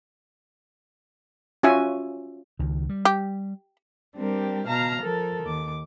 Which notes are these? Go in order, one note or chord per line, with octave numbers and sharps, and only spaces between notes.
C#4 F4 F#4 E5 G#5
C#2 D#3
G3
G4
G3 C4 D4 G4 A#4
B2 F5 A5 A#5 F6
F3 A4 A#4
D#2 D6